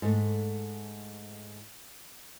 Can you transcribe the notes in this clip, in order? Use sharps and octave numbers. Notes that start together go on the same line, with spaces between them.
G#2 A3